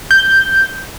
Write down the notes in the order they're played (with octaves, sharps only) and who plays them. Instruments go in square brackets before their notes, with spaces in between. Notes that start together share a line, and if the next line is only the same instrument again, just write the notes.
[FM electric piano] G6